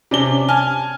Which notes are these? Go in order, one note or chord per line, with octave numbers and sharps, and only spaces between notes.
C3 C#4 D4 G7
G#5 A5 F6